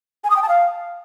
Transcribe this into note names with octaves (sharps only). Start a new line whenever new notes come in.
G#5
D#6
G5
A5
F5